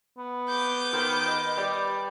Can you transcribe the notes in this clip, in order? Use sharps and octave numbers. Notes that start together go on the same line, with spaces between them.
B3
D6 G6
D#3 A#4 C5 F#5
B4 D#5 F#5
G3 D5